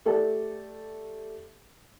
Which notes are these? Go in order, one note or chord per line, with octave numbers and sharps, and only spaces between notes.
A3 G4 A4 D5 A5